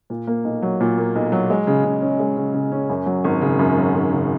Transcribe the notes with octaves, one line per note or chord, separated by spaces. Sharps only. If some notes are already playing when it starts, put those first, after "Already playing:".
A#2
A#3
B1
F#3
A#2
A#3
B1
F#3
G#3
C#3
C#3
C#4
G#3
C#3
C#3
C#4
F#2
F#3
G#1
C#3
F#2
F#3
G#1
C#3